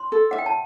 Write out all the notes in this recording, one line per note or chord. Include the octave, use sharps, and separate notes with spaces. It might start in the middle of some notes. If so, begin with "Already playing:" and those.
Already playing: C6
A4
E5 F#5
G5
A5